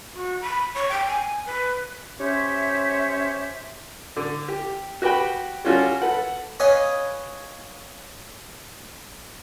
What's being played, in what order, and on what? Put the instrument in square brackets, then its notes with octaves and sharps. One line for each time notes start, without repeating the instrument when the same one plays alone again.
[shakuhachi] F#4
B5
C#5
G5
G#5
B4
[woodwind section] C#4 G4 C5 C#5 E5
[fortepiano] D3
G4
F#4 G4 B4 G5 B5
G3 C#4 F4 F#4 A4
A4 B4 F#5
[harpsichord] B4 C#5 D#5 F5 G#5